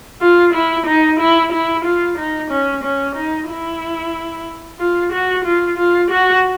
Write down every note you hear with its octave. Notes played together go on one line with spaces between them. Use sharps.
F4
E4
D#4
E4
E4
F4
D#4
C#4
C#4
D#4
E4
F4
F#4
F4
F4
F#4